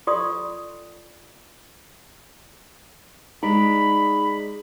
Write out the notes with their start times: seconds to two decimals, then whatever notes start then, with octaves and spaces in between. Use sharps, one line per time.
0.07 F4 A4 D5 C6 C#6 D#6
3.43 G#3 D#4 D5 B5